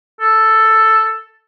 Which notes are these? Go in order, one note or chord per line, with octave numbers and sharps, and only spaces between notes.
A4